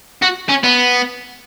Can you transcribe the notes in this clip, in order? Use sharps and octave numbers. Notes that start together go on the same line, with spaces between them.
F#4
C#4
B3